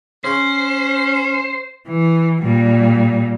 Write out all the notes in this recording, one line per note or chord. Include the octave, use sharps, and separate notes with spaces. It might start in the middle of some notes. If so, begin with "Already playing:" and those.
C#4 C5
E3
A#2 G3